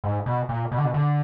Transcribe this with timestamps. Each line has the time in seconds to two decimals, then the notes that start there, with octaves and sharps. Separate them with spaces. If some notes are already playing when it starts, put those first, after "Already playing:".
0.04 G#2
0.26 B2
0.49 A#2
0.72 B2
0.78 D3
0.85 B2
0.94 D3